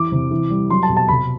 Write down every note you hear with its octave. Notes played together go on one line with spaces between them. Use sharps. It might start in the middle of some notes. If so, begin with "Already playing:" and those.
Already playing: E3 D6
C3
E3
G3
F#3 C6
A5
B2
A5
C3 B5